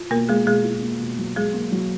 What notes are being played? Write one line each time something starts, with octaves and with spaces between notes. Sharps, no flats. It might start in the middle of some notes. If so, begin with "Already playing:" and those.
Already playing: F4
B2 A#3 A#4
G#3 A#3 G#4
B2 G#3 G#4
F4
A#3
B2
F#3
F#3 G#3 G#4
A#3
F#3